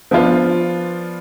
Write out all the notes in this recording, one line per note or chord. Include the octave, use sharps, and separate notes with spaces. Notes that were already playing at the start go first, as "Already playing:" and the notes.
F3 B3 D4 F4